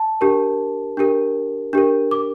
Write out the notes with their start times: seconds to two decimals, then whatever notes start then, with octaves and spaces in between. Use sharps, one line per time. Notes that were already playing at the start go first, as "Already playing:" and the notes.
Already playing: A5
0.21 D4 G4 A#4
0.97 D4 G4 A#4
1.73 D4 G4 A#4
2.11 D6